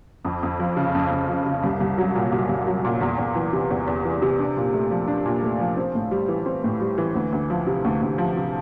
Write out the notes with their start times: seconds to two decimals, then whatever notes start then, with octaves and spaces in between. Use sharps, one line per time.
0.25 F2
0.43 F2
0.60 F3
0.77 C#3
0.95 F2
1.11 F2
1.29 F3
1.46 C#3
1.63 C2
1.80 C2
1.98 F#3
2.15 A#2
2.32 C2
2.49 C2
2.67 F#3
2.85 A#2
3.01 E2
3.18 E2
3.35 E3
3.53 C3
3.70 E2
3.87 E2
4.05 E3
4.22 C3
4.39 D4
4.57 A#2
4.74 A3
4.91 F3
5.08 D4
5.25 A#2
5.43 A3
5.60 F3
5.77 C4
5.95 A2
6.11 G3
6.28 E3
6.46 C4
6.64 A2
6.81 G3
6.98 E3
7.15 D2
7.33 D2
7.50 F3
7.67 C3
7.85 D2
8.02 D2
8.18 F3
8.36 C3